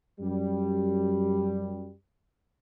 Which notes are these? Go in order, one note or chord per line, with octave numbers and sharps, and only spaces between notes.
F#2 G3